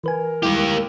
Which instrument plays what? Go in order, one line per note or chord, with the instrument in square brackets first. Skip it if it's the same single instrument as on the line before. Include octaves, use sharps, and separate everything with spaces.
[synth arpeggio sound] E3 B4 G#5 [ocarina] A#4
[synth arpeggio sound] G3 G#3 E4 [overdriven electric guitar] A#3 G4